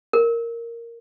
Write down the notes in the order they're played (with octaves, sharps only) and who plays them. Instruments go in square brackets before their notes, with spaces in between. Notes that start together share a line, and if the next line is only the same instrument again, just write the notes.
[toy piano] A#4